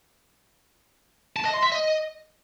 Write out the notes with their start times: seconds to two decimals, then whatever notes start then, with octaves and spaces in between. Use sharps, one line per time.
1.36 A5
1.45 D#5
1.54 C6
1.63 E5
1.72 D#5